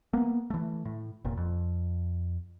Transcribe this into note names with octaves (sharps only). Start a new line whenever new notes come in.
A#3 B3
E3 A3
A2
F1 A#2
F2